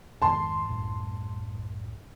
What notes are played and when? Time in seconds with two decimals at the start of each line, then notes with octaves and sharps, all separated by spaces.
0.22 F2 G#2 D#3 A5 C6
0.69 C2 F#2 A2